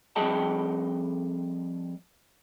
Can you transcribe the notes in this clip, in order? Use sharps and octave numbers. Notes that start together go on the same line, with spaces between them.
F2 G3 G#4 D#5 G5 A5